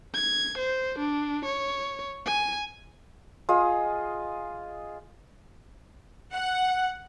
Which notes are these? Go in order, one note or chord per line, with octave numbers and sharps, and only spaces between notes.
G#6
C5
D4
C#5
G#5
F4 G#4 D#5
F#5